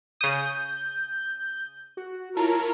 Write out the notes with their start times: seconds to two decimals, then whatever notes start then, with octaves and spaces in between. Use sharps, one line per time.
0.21 C#3 D#6 G6
1.97 F#4
2.37 E4 F4 A#4 C#5 A5